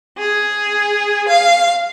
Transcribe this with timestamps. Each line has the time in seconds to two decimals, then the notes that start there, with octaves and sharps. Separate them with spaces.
0.18 G#4
1.29 F5